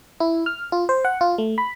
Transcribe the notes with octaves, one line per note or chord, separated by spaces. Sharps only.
E4
F6
F4
C5
F#5
F4
A3
B5